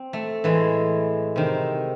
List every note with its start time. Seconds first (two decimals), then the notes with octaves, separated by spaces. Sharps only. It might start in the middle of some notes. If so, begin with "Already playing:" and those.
Already playing: C4
0.13 A3
0.44 A2 E3 G#3
1.36 C3 D#3